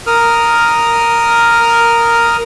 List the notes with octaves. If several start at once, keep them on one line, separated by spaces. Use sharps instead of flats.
A#4 D#6 F6